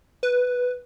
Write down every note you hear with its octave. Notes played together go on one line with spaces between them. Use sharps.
B4